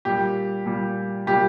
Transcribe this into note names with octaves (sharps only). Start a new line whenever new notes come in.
A#2 G3 G4
A#2 G3
A#2 G3 G4